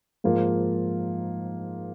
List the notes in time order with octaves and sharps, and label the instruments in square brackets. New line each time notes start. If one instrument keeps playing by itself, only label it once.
[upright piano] G#2 F3 A#3 F4